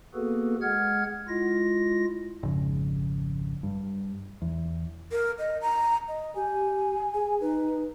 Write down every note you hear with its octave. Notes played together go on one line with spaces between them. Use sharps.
A#3 B3 F#4 G#4 A4 B4
G#3 G#4 F#5 F6 G#6
G#3 E4 F4 A#6
G#1 F2 C#3
G2
E2
A#4
D#5
A#5
D#5
G4 G#5
G#4
D#4 B4